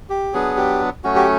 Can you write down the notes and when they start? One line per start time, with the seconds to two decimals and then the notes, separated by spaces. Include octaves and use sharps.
0.10 G4
0.33 F#3 B3 D4 G#4
0.57 G4
1.04 F#3 A3 C#4 F#4
1.15 G4